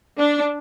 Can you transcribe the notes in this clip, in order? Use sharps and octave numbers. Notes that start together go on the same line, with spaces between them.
D4